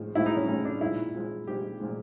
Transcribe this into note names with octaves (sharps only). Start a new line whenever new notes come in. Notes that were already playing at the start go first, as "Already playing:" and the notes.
Already playing: A2 F3 G#3
A2 F3 G#3 E4
D#4
C#4
A2 F3 G#3 C#4
D4
A#2 F3 G#3 E4
A#2 F3 G#3
A#2 F3 G#3 G4
A#2 F3 G#3